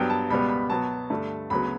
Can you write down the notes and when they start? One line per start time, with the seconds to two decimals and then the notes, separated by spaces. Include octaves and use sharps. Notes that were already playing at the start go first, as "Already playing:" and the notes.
Already playing: G2 F#3 B3 G5
0.10 A5
0.30 C#2 B2 G3 B3 B5
0.49 B5
0.70 B2 F#3 B3 A5
1.10 G2 D3 A3
1.50 D2 C#3 F#3 B3 B5